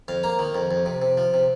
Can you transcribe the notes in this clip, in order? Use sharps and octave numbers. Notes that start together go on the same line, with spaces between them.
F2 F5
A#3 A#5
D#3
F2
F2
C3
C3
F3
C3